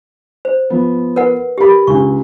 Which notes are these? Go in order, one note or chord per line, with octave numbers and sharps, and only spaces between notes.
C5
F3 B3
A#4 B4 F#5
G4 A#4 B5
C#2 D4 C#6